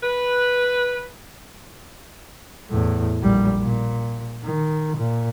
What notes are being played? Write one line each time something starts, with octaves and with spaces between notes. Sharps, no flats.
B4
E2 A2
A#1 G3
A#2
D#3
A#2